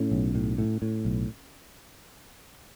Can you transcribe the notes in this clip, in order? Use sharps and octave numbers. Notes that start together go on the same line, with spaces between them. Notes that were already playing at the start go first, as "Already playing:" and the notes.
Already playing: A2 C#4
B1
A2
A2
A2
B1